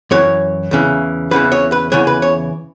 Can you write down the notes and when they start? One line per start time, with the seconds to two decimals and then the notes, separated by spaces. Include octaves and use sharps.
0.11 F#2 E3 C#5
0.71 E2 C#3 E3
1.31 E2 C#3 E3 B4
1.52 C#5
1.72 B4
1.92 E2 C#3 E3 C#5
2.07 B4
2.22 C#5